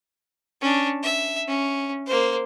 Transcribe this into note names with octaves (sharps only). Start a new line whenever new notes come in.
C#4 D4
E5
C#4
A#3 C5